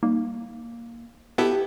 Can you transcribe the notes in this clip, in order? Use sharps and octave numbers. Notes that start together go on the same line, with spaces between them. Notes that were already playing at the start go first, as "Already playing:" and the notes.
G3 A#3 D#4
B3 E4 G4 A4